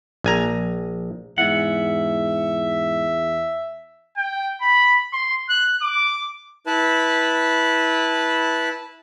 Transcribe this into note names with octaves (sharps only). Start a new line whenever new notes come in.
A#1 G#5 A#5
E2 G#2 E5 F#5
G5
B5
C6
F#6
D6
E4 B4 A5 B5